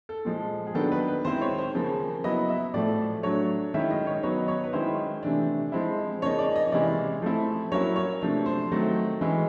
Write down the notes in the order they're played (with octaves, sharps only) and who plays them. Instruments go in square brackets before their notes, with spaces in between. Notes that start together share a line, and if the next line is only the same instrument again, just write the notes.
[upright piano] A4
A#2 F3 G#3
G#4
D#3 F#3 B3 D4 A4
B4
B4
D#3 G#3 C4 E4 C5
C#5
C5
C#3 F3 A#3
F#3 B3 E4 D#5
E5
A2 F3 A3 D5
F#3 A3 D4 C#5
D#3 G#3 C#4 E4 E5
D#5
C#5
F#3 B3 D#4 C#5
C#5
B4
D#3 G#3 C#4 E4 C5
C3 E3 A3 D4
F3 G#3 C4 E4
C#3 F3 A#3 D#4 C#5
D5
D#5
C3 E3 G#3 C#4 E4 D5
F3 A3 C4 E4
F#3 A#3 C#4 E4 C#5
C#5
C3 F3 A3 D4
C5
D#3 F#3 A3 C4
E3 G#3 C#4 E4